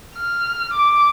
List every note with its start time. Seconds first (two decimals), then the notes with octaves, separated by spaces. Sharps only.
0.16 F6
0.73 D6